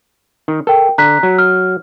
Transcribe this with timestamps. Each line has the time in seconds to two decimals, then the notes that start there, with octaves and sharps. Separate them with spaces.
0.48 D#3
0.67 A4 A#4 G5
0.98 D3 A#5 F#6 B6
1.23 F#3
1.39 F6